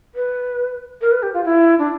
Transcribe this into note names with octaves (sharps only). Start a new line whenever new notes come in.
B4
A#4
B4
G4
F4
E4
D4